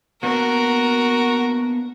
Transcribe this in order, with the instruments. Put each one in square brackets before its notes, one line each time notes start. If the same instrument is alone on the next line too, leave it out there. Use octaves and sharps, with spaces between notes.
[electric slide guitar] A#3 B3 D4 [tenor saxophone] F#4 [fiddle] A#4